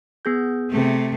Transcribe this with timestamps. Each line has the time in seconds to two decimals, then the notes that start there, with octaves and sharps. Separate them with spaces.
0.25 B3 G#4 G6
0.70 C3 A3